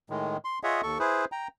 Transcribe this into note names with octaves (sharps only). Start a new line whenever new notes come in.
A2 D#3 G#3
C6
F4 G#4 C#5 D#5 E5 F#5
D#2 A4 C#6
E4 G#4 B4 C5
G5 A#5